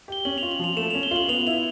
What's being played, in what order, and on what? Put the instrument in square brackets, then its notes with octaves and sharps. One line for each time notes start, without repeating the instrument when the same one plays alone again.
[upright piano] G4 [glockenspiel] G7
[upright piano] C#4 [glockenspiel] F#7
[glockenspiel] F7
[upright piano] F4
[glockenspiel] F#7
[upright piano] F3 [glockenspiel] F7
[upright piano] A3 [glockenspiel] E7
[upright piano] C#4 [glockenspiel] F7
[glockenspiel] G7
[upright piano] F4 [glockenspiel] F#7
[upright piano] B3 [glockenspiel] F7
[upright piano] E4 [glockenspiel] F7